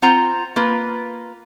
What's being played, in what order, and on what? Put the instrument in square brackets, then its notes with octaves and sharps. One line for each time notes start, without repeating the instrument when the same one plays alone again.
[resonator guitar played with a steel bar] C4 F4 C5 F#5 A#5
A#3 F4 B4